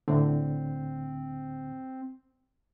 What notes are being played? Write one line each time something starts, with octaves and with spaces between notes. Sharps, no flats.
D2 A2 D3 C4